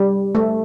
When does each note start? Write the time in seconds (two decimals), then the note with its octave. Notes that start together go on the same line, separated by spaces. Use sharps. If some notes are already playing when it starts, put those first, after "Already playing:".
Already playing: G3
0.35 A3